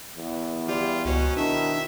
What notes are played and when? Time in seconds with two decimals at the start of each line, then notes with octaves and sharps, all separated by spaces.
0.15 E2
0.68 G3 F4 G4
1.05 C#2 B2 F#3 C#4 C5
1.37 D#3 D4 E4 E5